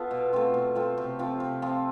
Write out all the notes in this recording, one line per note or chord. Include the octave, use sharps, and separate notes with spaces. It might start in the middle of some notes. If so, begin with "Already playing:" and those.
Already playing: B3 F4 A4
B2
A3 C4 F4
B2
A3 C4 F4
C3
F3 C4 F4
C3
F3 C4 F4